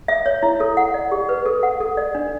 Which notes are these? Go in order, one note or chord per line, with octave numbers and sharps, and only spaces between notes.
E5
C#5
E4
A4
F#5
D5
G4
B4
A4
F#5
A4
D5
D4